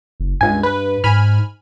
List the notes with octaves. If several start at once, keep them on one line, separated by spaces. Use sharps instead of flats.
F#1
C#2 G2 G#5
B4
G#2 G#5 B5 F6